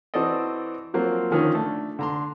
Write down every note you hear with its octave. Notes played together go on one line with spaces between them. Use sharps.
E3 C4 F#4 A4 D5 D#5
F3 F#3 A#3 C4 F4
D3 D#3 F3 C#4
A3 D4
D3 A#5 C6